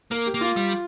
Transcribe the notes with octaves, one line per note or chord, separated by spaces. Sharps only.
A#3 A#4
G4
A#3
F4
G3